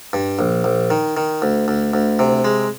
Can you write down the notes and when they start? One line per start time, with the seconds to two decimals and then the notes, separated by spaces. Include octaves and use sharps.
0.13 G2
0.39 A#1
0.64 A#1
0.90 D#3
1.17 D#3
1.42 D2
1.68 D2
1.94 D2
2.19 C3
2.44 G#3